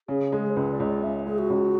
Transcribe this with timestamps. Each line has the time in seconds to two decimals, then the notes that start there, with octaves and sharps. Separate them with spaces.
0.08 C#3 G#4
0.32 G#3
0.50 C#5
0.56 C#2 B4
0.72 D5
0.80 C#2
0.87 D5
1.02 C#3 E5
1.26 G#3 G#4
1.38 F#4
1.50 C#2